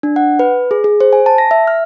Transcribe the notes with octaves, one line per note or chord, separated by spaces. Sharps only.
D4
F#5
B4
G#4
G#4
C5
G#5
A5
A#6
E5
F6